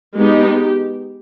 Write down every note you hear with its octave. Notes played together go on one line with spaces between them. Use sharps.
G#3 B3 D#4 G4